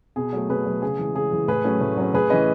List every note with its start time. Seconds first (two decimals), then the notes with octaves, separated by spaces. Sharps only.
0.16 B2 G#4
0.33 F#3 A3
0.49 B2 G#4 B4
0.66 F#3 A3
0.82 C#3 G#4
0.99 E3 G#3
1.15 C#3 G#4
1.31 E3 G#3
1.48 A2 G#4 B4
1.64 F#3 A3 C#4
1.81 A2
1.97 F#3 A3 C#4
2.14 A2 G#4 B4
2.30 E3 A3 C#4 B4 D#5